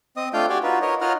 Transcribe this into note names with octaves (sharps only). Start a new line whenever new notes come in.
C4 D#5 D#6
A3 D4 F4 F5 G5 G6
F#4 G4 D5 G5 G#5
D#4 F4 F#4 B4
A#4 C#5 D#5
D#4 F4 C#5 D#5 F#5 F6